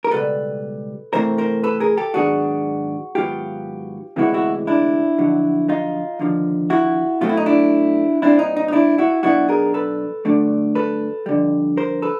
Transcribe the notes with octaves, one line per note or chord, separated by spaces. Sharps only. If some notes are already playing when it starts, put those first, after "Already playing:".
A#4
C#2 B2 G3 A4 B4
C3 E3 A3 C4 A#4 C5
A#4 C5
A4 B4
G#4 A#4
G4 A4
G#2 D#3 F#3 B3 D4 F#4 G#4
G#2 D#3 F#3 B3 F4 G4
D2 C3 E3 G#3 B3 E4 F#4
E4 F#4
D4 E4
F2 D3 F#3
D#4 F4
D#2 D3 F3
E4 F#4
B2 F#3 A3 C4 F4
E4
D#4
D4 E4
A#2 G3 C4 D4 E4
D#4
D#4
D#4
D4 E4
E4 F#4
B1 B2 F#3 B3 D4 E4 F#4
G#4 A#4
A4 B4
G2 D3 F#3 A3 D4
A4 B4
F2 D3 G3
A#4 C5
A4 B4